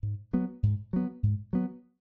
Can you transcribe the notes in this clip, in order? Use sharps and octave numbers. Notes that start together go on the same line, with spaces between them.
G#2
F#3 B3
G#2
F#3 B3
G#2
F#3 B3